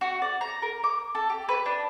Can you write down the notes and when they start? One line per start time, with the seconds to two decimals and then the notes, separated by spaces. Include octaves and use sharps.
0.01 F#4
0.22 D5
0.41 A#5
0.62 A#4
0.84 D6
1.15 A4
1.30 G4
1.49 B4
1.66 D4